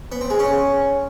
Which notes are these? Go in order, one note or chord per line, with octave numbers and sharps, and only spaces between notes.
B3
C4
G#3
C#4